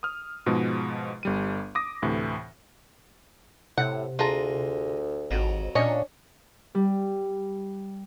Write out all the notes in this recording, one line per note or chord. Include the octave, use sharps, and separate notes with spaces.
D#6 F6
G#2 B2 F3 G#3
G1 G3 D#7
D6 D#6 A#6
D2 A2 C3 E3
A2 C3 F#5
D2 G#3 F4 A5 A#5
G#1 F2 F#3
A#2 C#4 D4 C#5 D#5
G3